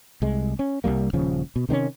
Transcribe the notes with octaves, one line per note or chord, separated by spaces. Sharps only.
C2 G#3
C#4
C2 F#2 G3 A#3
D#1 C#3 F3 C#4
B2
C3 D#3 C4 C#4